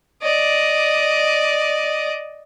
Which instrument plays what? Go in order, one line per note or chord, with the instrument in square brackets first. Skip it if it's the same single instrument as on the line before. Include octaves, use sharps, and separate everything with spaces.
[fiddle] D5 D#5